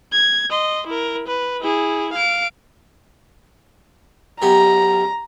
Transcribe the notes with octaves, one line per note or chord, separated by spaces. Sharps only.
G#6
D#5 C6
E4 A#4
B4
E4 G#4
F5 D7
F#2 B3 G4 A#5